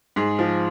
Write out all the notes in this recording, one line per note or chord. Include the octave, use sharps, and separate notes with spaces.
G#2 G#4
F3